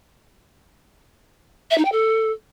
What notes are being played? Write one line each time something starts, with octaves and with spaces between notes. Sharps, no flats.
E5
D#4
G5
A4